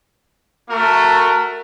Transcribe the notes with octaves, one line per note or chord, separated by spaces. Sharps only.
A3 F#4 A#4